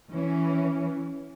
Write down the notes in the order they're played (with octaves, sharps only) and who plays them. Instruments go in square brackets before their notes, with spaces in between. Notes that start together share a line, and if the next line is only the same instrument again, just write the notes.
[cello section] E3 C#4